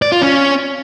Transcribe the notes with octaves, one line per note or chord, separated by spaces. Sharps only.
D5
F4
C#4